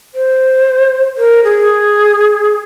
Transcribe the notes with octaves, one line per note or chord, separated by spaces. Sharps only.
C5
A#4
G#4